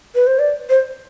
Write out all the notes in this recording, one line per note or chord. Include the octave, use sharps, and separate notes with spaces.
B4
C5
D5
C5